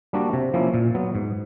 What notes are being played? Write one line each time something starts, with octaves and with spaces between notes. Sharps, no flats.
G3 A#3 D4 F#4
C3
F3 A#3 C#4 E4
A#2
F#3 B3
G#2